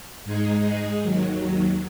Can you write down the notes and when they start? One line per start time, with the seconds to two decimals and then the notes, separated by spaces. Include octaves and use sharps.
0.24 G#2 G#3 D#4 G#4
1.03 D#2 D#3 F#3